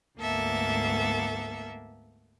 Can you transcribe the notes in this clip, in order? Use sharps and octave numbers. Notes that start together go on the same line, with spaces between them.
D2 G#2 A#3 B3 A4 E5